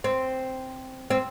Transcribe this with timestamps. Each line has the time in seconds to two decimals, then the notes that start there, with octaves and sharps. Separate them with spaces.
0.04 C4
1.10 C4